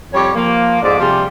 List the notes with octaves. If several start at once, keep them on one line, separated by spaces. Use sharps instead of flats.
F2 G3 G4 C#5
F3 A#3
F2 G#2 D5
C3 F3 G3 F4 G4 G#4